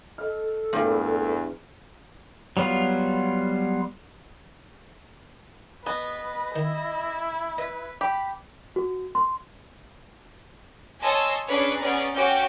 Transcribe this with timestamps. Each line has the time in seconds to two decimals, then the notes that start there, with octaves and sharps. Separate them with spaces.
0.18 A4 D#5 F6
0.73 E2 G2 A#2 A3
2.57 F#3 G3 B3 F4
5.86 B3 B4 D#5 G#5
6.56 D#3 E4
7.58 B4 D#5
8.01 G4 B5
8.76 F#4
9.15 C6
11.02 C#5 D#5 G#5 A5 C6 E6
11.47 C#4 D4 G#4 B4 C#5
11.78 B3 C#4 G#4 D5 A#5
12.14 C#4 F#4 C#5 G5 D6 G6